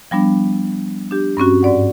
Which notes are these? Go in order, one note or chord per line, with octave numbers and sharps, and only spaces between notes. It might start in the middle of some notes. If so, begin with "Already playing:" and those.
F3 G3 B3 D4
D4 G4
G2 C4 C#4 F#4
G#2 D5 F#5